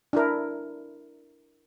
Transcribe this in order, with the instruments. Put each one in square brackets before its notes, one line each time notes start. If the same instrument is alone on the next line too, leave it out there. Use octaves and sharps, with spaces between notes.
[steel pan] D4 E4 A#4